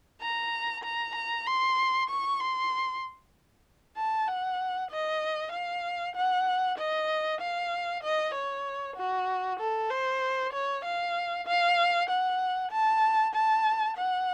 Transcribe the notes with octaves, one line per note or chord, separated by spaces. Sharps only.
A#5
A#5
A#5
C6
C#6
C6
A5
F#5
D#5
F5
F#5
D#5
F5
D#5
C#5
F#4
A4
C5
C#5
F5
F5
F#5
A5
A5
F#5